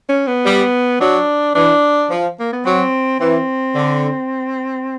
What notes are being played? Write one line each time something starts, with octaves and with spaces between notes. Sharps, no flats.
C#4
B3
G3
F#3 D4
E3 D4
F3
A#3
B3
F#3 C4
E3 C4
D3